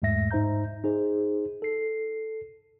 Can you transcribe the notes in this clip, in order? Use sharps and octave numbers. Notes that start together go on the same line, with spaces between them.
E2 G#2 G#3 A3 E5 A#6
G#2 D#4 C5 E5 A#5 G6
D#4 G#4 C5
A4 C7